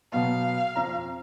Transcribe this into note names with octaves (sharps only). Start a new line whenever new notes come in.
B2 F#3 B3 F5
F2 A#5